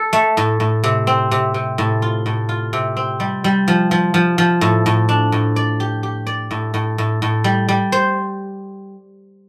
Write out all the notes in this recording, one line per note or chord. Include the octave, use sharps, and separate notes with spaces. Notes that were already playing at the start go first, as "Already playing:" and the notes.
Already playing: A4
A3
A2
A2
C3
C4
C3
C3
A2
F4
A2
F4
C3
C4
G3
G3
F3
F3
F3
F3
A2
A2
D4
A2
D5
G4
G4
D5
A2
A2
A2
A2
G3
G3
C5